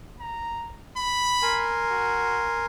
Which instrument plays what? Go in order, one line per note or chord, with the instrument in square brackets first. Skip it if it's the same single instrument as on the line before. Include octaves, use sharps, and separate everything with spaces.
[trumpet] A#5
B5
[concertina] A#4 G#5 C6
[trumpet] F#4